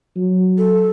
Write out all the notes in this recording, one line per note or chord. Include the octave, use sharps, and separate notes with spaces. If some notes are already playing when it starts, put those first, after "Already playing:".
F#3
A4